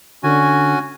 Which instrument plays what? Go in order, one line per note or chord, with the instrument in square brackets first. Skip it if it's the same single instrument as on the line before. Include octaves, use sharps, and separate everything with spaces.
[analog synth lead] D3 [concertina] C#4 F#4 G#5